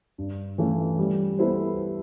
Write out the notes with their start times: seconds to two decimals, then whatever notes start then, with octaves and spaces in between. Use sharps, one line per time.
0.18 G2
0.58 E3 A3 C#4 F4
0.99 G3
1.38 B3 E4 A4 C5